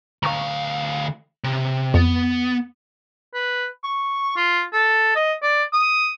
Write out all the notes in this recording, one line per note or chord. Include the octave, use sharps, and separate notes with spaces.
D2 F5 A#5 C#6
C3
F2 B3
B4
C#6
F4
A4
D#5
D5
D#6